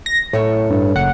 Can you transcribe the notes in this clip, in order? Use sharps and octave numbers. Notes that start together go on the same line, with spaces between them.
A#6
F#2 A2 A3 C#5
G2
F#1 F#5